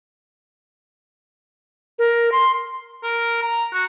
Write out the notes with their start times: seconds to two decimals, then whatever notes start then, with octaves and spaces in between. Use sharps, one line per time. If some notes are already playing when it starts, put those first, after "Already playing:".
1.99 A#4
2.32 C6
3.03 A#4
3.42 A#5
3.73 F#4